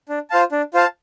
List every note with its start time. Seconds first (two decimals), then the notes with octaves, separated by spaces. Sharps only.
0.09 D4
0.30 F4 C5 F5 A5
0.52 D4
0.74 F4 C5 F5 A5